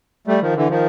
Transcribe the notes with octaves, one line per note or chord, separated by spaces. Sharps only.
G3 A3
D#3 F3
D3 E3
D#3 F3